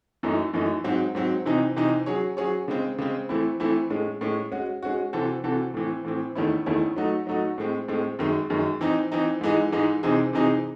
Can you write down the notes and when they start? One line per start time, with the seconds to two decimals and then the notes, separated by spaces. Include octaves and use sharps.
0.23 F#2 E3 A3 D#4
0.53 F#2 E3 A3 D#4
0.84 G#2 F#3 C4
1.15 G#2 F#3 C4
1.45 C3 E3 C4 D#4
1.76 C3 E3 C4 D#4
2.06 F#3 C#4 G#4 C#5
2.37 F#3 C#4 G#4 C#5
2.68 C#3 G#3 C4
2.99 C#3 G#3 C4
3.29 E3 A3 C4 E4
3.60 E3 A3 C4 E4
3.90 A2 G#3 C#4
4.21 A2 G#3 C#4
4.51 G#3 C#4 F#4
4.83 G#3 C#4 F#4
5.13 C3 E3 C4 F#4 A4
5.44 C3 E3 C4 F#4 A4
5.74 A2 E3 C4
6.04 A2 E3 C4
6.35 E2 D#3 A3 C#4 E4
6.66 E2 D#3 A3 C#4 E4
6.96 F#3 A3 D#4 F#4
7.27 F#3 A3 D#4 F#4
7.58 A2 G#3 C4
7.88 A2 G#3 C4
8.19 F#2 D#3 G#3
8.50 F#2 D#3 G#3
8.81 E3 C4 D#4
9.12 E3 C4 D#4
9.41 G#2 E3 G#3 D#4
9.72 G#2 E3 G#3 D#4
10.03 C3 E3 C4 D#4 G#4
10.33 C3 E3 C4 D#4 G#4